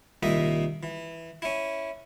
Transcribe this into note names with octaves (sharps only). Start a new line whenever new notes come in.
C2 A#2 D#3 D#5 E5 D6
E3
C#4 E4